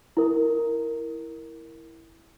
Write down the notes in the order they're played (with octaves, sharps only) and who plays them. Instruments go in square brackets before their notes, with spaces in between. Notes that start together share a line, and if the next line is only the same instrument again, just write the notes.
[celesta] E4 A#4